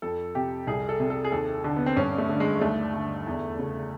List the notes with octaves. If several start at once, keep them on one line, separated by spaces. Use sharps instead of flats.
F2 A4
C3 G4
C2 G#4
A4
C3
A4
G#4
D#2 A4
D3
B3
C4
G2 C#4
A3
D3
G#3
D#2 A3
D3
E2
C#3